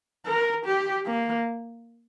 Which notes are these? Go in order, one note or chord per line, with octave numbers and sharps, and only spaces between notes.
A#4
G4
A#3